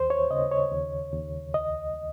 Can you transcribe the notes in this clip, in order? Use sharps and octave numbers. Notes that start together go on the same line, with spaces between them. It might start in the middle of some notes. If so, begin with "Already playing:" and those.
Already playing: D#2 C5
C#5
C#3 D#5
C#5
D#2
D#2
C#2 D#5